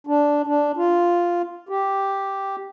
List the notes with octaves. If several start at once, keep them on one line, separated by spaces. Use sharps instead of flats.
D4
D4
F4
G4